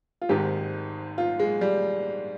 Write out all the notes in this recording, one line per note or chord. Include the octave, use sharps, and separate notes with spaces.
F4
G#1 G#2 D#3 G4
F4
G#3
G3